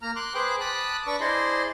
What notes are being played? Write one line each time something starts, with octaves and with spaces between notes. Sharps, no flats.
A#3 A#5 F6
C6 D6 F#6
G#4 B4 C5 G5 D6 F#6
A5 B5 D6 D#6 F#6
D4 B4 A5 C#6 D6 E6
E4 G#4 C5 D5 D#5 C6